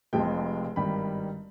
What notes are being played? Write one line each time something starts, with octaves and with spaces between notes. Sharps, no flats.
F1 F2 C3 F3 G#3 G5
G#1 G2 D#3 G3 B5